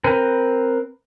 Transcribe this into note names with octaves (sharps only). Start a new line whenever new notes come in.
C4 A#4 B4